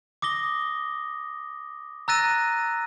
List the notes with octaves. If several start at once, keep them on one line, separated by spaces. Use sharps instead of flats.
D6 D#6 A#6 G7
A#5 E6 F#6 A6 A#6 D#7